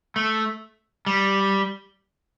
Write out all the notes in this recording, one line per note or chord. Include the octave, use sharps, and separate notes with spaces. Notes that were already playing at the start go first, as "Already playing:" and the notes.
A3
G3